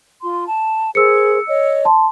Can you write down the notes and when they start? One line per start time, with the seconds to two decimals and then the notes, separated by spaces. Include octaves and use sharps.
0.22 F4 C6
0.47 A5
0.95 G#4 A#4 C5 E6 C#7
1.47 C#5 D#5
1.85 A5 C6